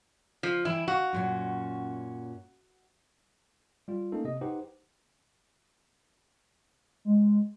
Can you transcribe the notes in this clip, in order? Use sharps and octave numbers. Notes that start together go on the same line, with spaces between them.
F3
E3 E4 G5
F#4 F5
F#2 A#2 C#4
G3 F4
A3 A#3 C#4 D#4 A4
C3 D#5
D#4 G4 B4 C5 F#5
G#3